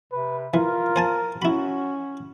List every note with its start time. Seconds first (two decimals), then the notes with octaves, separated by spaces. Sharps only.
0.12 C3 B4
0.54 E3 F4 A#4
0.96 C5 G#5 A5
1.42 C#4 E4 F#4 B5